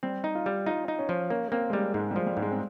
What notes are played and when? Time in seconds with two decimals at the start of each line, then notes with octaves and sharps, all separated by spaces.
0.03 G3 C4
0.24 D#4
0.35 F4
0.46 G3
0.66 D#4 F4
0.88 D#4
0.99 C#4
1.09 F3
1.30 A#3 C#4
1.52 A#3 C4
1.70 G#3
1.73 G3 A#3
1.94 G#2 G#3
2.11 G3
2.16 F3
2.27 G3
2.37 G#2
2.42 G#3
2.52 C4